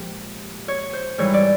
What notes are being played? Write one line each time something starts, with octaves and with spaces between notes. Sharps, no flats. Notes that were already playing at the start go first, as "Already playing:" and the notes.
Already playing: A#2 F3 G#3 G4
C#5
C5
G#2 E3 G3 C#5
D5